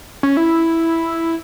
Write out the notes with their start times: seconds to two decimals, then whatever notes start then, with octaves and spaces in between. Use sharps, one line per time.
0.23 C#4
0.37 E4